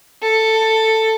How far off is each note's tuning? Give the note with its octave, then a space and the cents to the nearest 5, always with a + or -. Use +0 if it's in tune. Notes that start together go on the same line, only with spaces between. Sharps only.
A4 +10